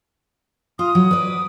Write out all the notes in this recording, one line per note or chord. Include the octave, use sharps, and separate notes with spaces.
F4 D#6
F#3
B4 D5